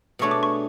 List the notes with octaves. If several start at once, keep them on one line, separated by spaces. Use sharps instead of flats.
B2 A3 D4 G#4 C#5 C#6
D6
C#6